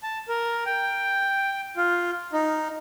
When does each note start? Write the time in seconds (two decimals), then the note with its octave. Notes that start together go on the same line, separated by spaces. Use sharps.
0.03 A5
0.28 A#4
0.66 G5
1.77 F4
2.33 D#4